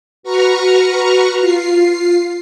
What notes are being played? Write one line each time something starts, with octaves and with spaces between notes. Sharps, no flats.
F#4 B4 A#5 C#6 F6
F4 C7